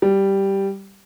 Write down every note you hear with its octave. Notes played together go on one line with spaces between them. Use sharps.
G3